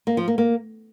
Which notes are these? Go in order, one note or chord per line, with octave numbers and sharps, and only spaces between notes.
A#3
F3
A#3
A#3